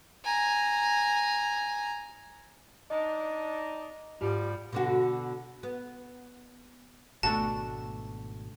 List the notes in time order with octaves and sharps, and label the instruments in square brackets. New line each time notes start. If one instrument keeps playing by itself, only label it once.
[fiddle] G#5 A#5
[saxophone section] D4 D#4 [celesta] D#5
[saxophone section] D2 F3 G3 [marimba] G#2 F4 G4
[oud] B2 D3 F#4
B3
[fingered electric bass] G#1 B2 B3 [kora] A3 D4 F#4 [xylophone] A5